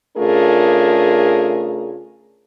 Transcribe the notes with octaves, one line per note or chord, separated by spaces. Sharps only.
C#3 A3 D4 F4 G#4 A#4